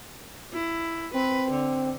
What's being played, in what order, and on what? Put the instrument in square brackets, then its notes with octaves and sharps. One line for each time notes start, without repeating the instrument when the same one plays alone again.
[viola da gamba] E4
[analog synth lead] C4 [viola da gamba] B4
[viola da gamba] D3